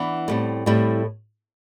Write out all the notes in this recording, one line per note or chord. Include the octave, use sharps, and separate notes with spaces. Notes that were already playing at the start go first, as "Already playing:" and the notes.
Already playing: E3 B3 D4
A2 G3 C4
A2 G3 C4 E4